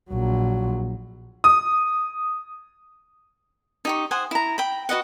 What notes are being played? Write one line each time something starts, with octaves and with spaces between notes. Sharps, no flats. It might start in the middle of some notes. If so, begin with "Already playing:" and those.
A#1 F#3
D#6
D#4 G4 C#6
C5 F#5 G#5 D#6
E4 A#5
G5 B5
F#4 B4 D#5 F#5